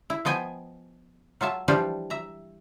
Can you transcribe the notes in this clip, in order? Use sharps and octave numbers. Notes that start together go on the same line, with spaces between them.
E4
F3 B3 D#5 G5 G#5
F#3 F4 E5 A5
E3 F3 G3 D4 F4 G4
E5 A#5